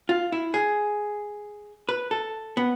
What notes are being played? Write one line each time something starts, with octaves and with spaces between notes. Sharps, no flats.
F4
E4
G#4
B4
A4
B3